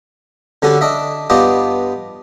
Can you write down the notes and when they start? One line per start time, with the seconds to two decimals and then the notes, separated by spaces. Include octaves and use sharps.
0.62 D3 G3 C#4 D4 F#4 A4
0.81 D4 D#5 E5
1.30 G2 B3 D4 F4 G4 D#5